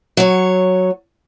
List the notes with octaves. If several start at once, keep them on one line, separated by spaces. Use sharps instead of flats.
F#3 C#5